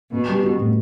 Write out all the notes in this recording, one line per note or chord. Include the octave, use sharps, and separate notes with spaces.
B2 B3
G3
F#4
A2